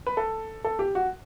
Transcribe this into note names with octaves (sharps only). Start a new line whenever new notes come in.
B4
A4
A4
G4
F#4